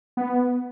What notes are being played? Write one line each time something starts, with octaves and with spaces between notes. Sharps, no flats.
B3